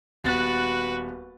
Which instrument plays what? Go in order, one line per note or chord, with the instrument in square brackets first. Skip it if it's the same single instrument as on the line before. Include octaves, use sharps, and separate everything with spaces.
[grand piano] D#1 B3 A6 [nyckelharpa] F#4 B4